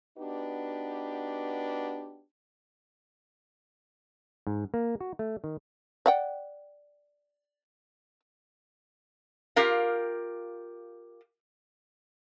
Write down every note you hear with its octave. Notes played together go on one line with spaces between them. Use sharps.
B3 D4 D#4 F#4 G4 B4
G#2
A#3
F#4
A3
D#3
D5 F#5 G5
F4 G4 A#4 F5